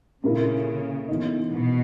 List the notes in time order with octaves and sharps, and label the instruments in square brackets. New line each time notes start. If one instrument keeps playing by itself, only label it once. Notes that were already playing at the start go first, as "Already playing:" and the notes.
[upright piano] A#2 A#3 E4 A#4 [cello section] C#3
[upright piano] E3 B3 D#4
[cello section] B2